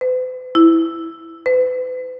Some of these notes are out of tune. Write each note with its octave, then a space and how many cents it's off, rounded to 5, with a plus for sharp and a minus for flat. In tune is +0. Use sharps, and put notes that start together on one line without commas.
B4 +45
E4 +0
B4 +40